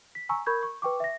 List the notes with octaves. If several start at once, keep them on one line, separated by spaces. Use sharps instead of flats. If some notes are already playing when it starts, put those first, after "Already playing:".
B6
G#5 A#5 C#6 E6
A#4 B5 C#6 G6 G#6
C#6
B4 G5 C#6 D6
E5 A#6